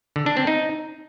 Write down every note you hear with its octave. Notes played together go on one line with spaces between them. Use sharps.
D3
D4
C4
D#4